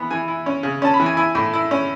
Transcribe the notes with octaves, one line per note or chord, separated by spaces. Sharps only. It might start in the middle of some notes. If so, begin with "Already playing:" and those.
Already playing: E3 B3 B5
E3 G#5
E4
C#4
C#3
C#4 A5
B5
E3
G#5
E4 G#5
A2
E4
C#4